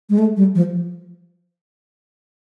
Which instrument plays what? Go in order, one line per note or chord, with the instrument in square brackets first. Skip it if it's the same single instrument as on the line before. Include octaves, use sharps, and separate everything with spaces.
[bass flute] G#3
A3
G3
F3